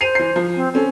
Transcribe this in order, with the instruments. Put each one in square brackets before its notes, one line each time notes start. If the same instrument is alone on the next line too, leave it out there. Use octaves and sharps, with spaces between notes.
[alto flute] C5 [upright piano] C7 D#7 F7
[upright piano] E3 C7
F3
[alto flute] C4
[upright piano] C4 C#4 [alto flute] A4